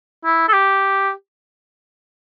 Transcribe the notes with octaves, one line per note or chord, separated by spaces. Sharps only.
E4
A4
G4